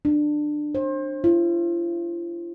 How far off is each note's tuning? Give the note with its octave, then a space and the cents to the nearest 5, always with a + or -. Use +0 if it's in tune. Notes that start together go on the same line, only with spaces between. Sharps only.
D4 +20
C5 +35
F4 -40